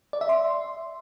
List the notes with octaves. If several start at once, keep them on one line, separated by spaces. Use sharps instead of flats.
D5
E5
C6